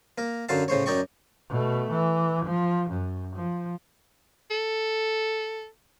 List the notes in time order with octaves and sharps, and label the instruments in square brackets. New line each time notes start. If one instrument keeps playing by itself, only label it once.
[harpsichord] A#3 A#4
F#2 D3 F#3 F5 A5
A2 C#3 C5 C#5
F#2 D#4 C#5 D5 G5 C#6
[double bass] B2 A3
E3
F3
F#2
F3
[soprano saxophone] A4